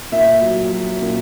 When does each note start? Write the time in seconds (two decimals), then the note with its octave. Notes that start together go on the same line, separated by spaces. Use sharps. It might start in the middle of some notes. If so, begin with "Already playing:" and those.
0.12 A#2 E5
0.42 F#3
0.72 F#3
1.01 A#2